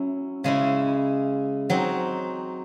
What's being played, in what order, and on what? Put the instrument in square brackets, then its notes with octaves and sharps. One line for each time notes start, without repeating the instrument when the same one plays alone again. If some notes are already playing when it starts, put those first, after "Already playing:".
Already playing: [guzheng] F#3 C#4 E4
C#3 G#3 C#4 E4
F#3 C4 D#4